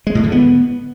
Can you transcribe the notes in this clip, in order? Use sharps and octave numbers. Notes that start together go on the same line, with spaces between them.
G#3
A2
D3
B3